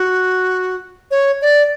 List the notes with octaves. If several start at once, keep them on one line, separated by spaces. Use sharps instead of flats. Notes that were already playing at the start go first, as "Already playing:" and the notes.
Already playing: F#4
C#5
D5